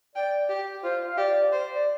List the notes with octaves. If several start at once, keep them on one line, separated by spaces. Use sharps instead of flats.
D5 G5
G4
F4 C5
F5
G4 D5
C5
D5